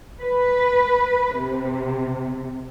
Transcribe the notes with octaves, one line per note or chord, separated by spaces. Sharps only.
B4
C3